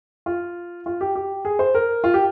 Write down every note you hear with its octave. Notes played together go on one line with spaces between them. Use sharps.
F4
F4
G4
G4
G#4
C5
A#4
F4
G4